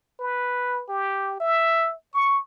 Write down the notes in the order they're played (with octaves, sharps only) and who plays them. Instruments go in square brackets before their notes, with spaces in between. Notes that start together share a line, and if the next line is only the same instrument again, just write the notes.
[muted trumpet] B4
G4
E5
C#6